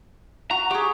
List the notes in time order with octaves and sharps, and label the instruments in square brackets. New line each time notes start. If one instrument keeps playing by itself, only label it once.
[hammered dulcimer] F#4 [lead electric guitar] A#5
[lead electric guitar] G4 [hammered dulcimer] G#4 C#6